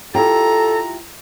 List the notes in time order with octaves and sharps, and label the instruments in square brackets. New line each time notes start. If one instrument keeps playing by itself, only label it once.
[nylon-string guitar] E4 F4 G4 [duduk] A4 [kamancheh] A#5